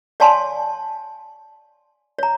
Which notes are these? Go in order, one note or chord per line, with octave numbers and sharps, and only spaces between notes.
C#5 D5 F5 G#5 A5 C6
C#5 A#5